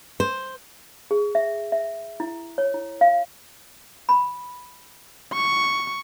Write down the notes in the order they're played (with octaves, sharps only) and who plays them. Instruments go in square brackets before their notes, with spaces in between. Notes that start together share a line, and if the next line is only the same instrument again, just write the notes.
[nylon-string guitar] C5
[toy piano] G#4
E5
E5
E4
C#5
E4
F5
B5
[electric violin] C#6